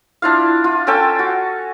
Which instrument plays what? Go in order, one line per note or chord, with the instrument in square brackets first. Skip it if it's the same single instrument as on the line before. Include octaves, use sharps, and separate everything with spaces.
[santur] D4 E4 F4 F5
F4
C#4 A4 G5 A5
F#4